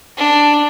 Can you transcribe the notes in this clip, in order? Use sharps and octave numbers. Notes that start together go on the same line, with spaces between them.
D4